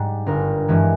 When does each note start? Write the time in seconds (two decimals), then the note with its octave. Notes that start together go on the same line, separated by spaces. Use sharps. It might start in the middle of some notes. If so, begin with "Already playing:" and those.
Already playing: G#2 G3
0.26 G1 A#4
0.68 G2 E3 G#3